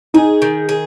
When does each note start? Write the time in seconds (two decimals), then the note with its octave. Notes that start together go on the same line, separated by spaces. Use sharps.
0.14 D#4 G#4
0.42 D#3
0.69 G#4